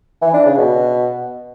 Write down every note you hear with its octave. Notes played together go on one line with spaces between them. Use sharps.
E3
D4
C#3
B2